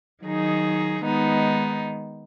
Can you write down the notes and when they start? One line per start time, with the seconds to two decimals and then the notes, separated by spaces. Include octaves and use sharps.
0.24 D#3 F#3 D#4 G#4
1.03 D#3 G#3 B3 D#4